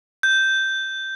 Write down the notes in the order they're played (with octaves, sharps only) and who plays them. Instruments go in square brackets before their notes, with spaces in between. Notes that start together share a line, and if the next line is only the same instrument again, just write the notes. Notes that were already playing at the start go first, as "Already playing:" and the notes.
[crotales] G6